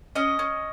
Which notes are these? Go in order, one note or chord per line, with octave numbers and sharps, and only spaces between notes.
C#4 D#5
C#4